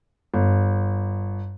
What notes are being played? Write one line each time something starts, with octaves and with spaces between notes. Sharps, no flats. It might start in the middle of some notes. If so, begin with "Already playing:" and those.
G1